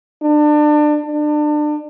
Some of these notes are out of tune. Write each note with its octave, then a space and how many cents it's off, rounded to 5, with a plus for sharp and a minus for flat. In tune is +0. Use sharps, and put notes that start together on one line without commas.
D4 +30
D4 +30